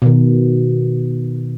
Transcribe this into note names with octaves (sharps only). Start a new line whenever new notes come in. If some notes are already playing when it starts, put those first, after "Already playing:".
B2 D#3